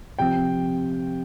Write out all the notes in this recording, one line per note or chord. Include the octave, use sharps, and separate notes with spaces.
C3 F3 G5